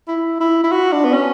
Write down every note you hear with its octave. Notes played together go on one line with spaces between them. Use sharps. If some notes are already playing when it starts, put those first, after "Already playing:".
E4
E4
E4
F#4
D4
B3
C#4